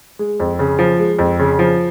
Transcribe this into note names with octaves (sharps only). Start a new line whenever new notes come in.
G#3
F2
C#3
F3
G#3
F2
C#3
F3